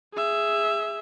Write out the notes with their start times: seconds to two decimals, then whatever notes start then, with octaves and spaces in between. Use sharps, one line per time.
0.14 G#4 E5